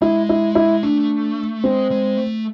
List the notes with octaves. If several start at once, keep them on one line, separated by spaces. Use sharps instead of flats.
G#3 E4
E4
E4
A3 D4
G#3 C4
G#3
A3